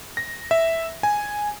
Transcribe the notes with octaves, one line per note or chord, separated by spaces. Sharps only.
A#6
E5
G#5